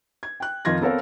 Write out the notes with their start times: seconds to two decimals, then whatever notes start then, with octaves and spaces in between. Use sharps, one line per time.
0.23 G#6
0.40 G5 F#6
0.65 F2 D#3 F3 F4 G#6 A#6
0.81 B3 C4 A4 A#4 C#5 F5